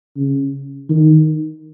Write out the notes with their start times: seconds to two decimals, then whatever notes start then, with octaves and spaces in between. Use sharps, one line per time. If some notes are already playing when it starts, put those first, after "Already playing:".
0.16 C#3
0.90 D#3